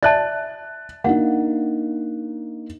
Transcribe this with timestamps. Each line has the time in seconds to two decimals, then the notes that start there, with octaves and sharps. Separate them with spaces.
0.03 D5 E5 A5 F#6 A6
1.04 A#3 D4 D#4 F5 F#5